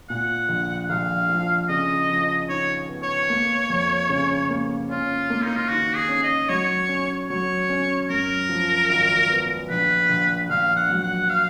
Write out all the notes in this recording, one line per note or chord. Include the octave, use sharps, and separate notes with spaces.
A#2 F#5
A#1
A#1 F5
F3
C#3 D#5
F3
D#4 C#5
B3
C#5
A#3
F2
C#3
A#3
C#4 F4
A#3
D#4
F4
D#3 F#4
G#4
C#4
D#5
F#3 C#5
C#4
F#3 C#5
C#4
F#2 A#4
F3
G#1
B3
A#1 B4
A#1
A#1 F5
F#5
F#3
F#5
F5